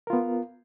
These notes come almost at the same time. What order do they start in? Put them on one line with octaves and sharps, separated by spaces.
A#4 F4 B3